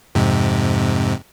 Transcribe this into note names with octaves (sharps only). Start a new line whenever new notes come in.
F2 G#2 C3